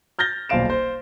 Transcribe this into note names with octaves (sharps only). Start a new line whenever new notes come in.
F6 G6 A6 A#6 G7
D#1 B1 C5 F5 D7 E7
C5